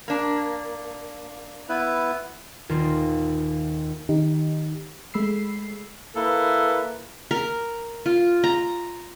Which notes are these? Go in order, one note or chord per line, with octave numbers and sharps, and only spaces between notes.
A#3 D4
B3 E4 B4
D#1 D#2 D#3 F4
D#3 D#4 G4
G#3 A3 B5 E6 C7
A#3 E4 A4 B4
A#4
F4
A#5